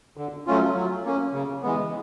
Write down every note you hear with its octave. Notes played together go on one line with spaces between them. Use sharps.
D3
F#3 A3 C#4 F4
F#3
A#3 C#4
C#3
E3 G#3 B3